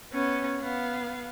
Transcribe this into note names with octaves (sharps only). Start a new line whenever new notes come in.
B3 C#4
B3 F5